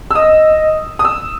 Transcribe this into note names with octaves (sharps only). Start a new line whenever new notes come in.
E6
D#5 D#6
D#6
E6